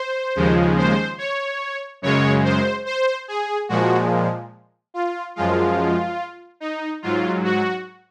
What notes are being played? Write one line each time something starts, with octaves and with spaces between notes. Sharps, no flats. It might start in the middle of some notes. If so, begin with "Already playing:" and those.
Already playing: C5
D#2 C#3 F3 G#3
C5
C#5
F#2 C#3 G#3 C#5
C5
C5
G#4
A#2 F3 G#3 F#4
F4
F#2 F3 G#3 F4
D#4
G#2 F#3 F4
F#4